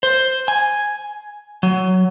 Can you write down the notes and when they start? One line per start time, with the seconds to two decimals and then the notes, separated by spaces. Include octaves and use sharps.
0.03 C5
0.48 G#5
1.63 F#3